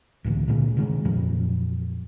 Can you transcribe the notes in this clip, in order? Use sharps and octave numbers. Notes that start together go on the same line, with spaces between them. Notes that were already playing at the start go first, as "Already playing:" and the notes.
C#2 A2 D3 E3
A#2 D3 G#3
C3 D#3 G3 G#3
F2 A#2 F3 F#3